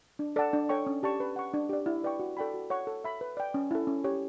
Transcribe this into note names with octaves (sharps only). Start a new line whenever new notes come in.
D4
A4 D5 F#5 A5
D4
A4 C#5 G5 C#6
C#4
G4 D5 A5 C#6
B4
F#5 C#6
D4
G4 D5
E4
B4 D5 G5 C#6
F#4
A4 D5 G5 B5
F#4
C#5 F#5 C#6
A4
E5 B5
B4
D5 G5
C#4
E4 A4
C#4
G4 C#5